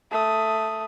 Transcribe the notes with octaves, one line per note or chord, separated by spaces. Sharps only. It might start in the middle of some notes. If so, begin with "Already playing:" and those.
A3 D#6